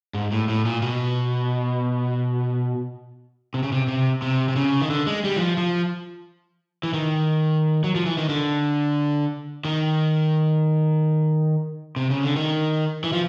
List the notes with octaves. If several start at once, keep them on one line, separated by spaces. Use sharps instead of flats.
G#2
A2
A2
A#2
B2
C3
C#3
C3
C3
C3
C3
C#3
D#3
D3
G#3
G3
E3
F3
F3
E3
D#3
F#3
F3
E3
D#3
D3
D#3
C3
C#3
D3
D#3
E3
F3